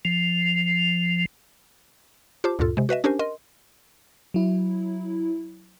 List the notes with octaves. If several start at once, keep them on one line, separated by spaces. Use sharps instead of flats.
F3
F4 G4 C5 A5 D6
D2 G2 A#2 F4 A4
C3 G#3
F#4 B4 D#5 E5
C#4 D4 G4 A#4 C5 G#5
A#4 D#5 C6
F#3 E4